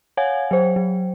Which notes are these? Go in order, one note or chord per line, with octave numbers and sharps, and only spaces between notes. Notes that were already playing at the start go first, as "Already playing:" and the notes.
C#5 F5 F#5 G#5 G#6
F#3 C5
F#3